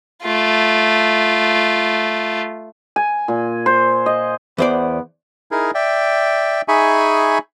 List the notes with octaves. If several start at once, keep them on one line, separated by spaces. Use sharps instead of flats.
A3 F4
G#5
A#2
C5
D#5
E2 B3 C5 D5
D#4 E4 G#4 A#4
D5 E5 G5
D#4 G#4 E5 G#5 B5 C#6